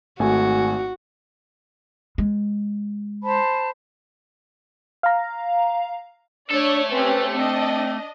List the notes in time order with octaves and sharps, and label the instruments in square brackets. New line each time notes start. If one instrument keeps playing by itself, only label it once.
[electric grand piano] G#1 A3 G#5 [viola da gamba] F#4
[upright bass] G#3
[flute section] C5 A5 B5
[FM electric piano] F5 A#5
[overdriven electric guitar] A3 A4 [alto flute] D4 [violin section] C#5 D5
[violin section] C4 C#4 G4 [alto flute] B4
[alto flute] C4 [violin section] D4 D#5